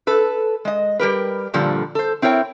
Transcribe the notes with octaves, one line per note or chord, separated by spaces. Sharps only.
A4 B4
G#3 D#5
G3 G4 A#4 B4
G2 A#2 D3 F3 G3
A4 C5
C4 E4 A#4 C#5 G5